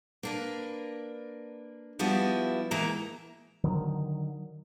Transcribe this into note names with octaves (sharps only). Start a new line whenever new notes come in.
A#3 D4 B4
F3 G3 B3 E4 F#4
E3 G#3 A#3 E5 A#5
D3 D#3 F#3